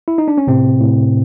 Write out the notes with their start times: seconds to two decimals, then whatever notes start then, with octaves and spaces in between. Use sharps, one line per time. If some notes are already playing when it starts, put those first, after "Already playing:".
0.08 E4
0.18 D#4
0.28 D4
0.38 C#4
0.47 A2 C3 C4
0.80 A2